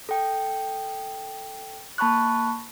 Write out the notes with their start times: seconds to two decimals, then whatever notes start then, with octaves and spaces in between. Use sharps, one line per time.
0.09 A4 G5
1.98 A#3 A5 B5 C#6 F#6